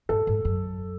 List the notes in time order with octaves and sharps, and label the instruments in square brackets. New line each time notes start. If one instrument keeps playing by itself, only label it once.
[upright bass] G#2 [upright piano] A4
[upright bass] G#2
F#2